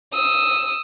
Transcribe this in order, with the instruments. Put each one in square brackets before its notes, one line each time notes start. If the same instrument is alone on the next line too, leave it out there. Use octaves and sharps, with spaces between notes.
[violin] D#6 E6